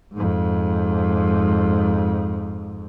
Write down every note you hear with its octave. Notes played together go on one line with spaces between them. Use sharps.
F2 G#2